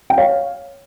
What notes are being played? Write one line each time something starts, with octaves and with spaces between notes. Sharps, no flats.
G5
C#5 F5